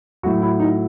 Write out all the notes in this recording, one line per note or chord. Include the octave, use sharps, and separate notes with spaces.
A2 F#3 F#4
E4
D#4